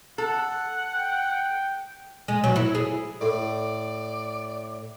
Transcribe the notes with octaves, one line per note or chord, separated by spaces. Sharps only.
A4 F#5
G5
G#3
F#3
E4
G#4
A2 D5